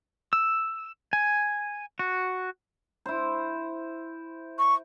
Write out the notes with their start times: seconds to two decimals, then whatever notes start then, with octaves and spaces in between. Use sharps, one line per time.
0.33 E6
1.13 G#5
1.99 F#4
3.06 E4 C5
4.58 C#6